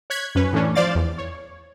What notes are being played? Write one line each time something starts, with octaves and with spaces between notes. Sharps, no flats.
C#5 F#6 G#6 B6
F#2 C#4 B4
A2 E3 A3 C#4 D4
F3 C5 D5 F5 A6
E2
C#5